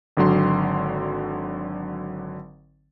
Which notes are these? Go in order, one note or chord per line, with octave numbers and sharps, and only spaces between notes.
G#1 D3 F#3 C6